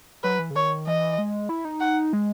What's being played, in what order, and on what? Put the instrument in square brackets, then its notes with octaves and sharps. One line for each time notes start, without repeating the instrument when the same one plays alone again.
[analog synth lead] F#3 [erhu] B4
[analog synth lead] E3
C#3
[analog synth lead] D#3 [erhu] C#5
[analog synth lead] E3 [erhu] D#5
[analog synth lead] G#3
E4
D#4
[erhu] F#5
[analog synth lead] G#3